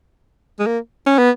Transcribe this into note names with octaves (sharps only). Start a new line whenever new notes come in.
G#3
A#3
C#4
B3